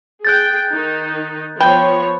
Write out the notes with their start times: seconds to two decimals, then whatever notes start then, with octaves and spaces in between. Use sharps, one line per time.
0.25 G#4 G5 F#6 G6 A6
0.71 D#3 D#4
1.60 F3 B3 C#5 G5 B5